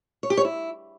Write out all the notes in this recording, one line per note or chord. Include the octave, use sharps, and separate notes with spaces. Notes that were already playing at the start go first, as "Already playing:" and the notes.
C#5
G4
C#5
E4